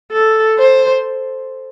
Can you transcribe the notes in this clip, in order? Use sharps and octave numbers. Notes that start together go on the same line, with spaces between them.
A4
C5